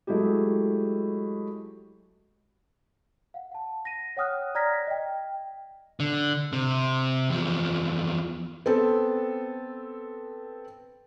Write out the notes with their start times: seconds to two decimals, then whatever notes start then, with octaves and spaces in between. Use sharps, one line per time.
0.07 F#3 G#3 A3 E4 G4
3.34 F5 F#5
3.52 F#5 A5
3.85 A#6 D#7
4.17 C#5 F#5 G5 D#6 F6 F#6
4.55 D5 A#5 F6 G#6 A#6 B6
4.87 D#5 G5
6.00 D3
6.53 C3
7.29 E2 F3
8.66 B3 C4 A4